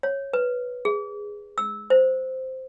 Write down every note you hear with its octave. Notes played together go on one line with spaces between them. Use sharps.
C#5
B4
G#4
E6
C5